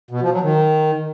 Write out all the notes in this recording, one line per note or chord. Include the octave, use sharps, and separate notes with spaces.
B2
F3
F#3
D#3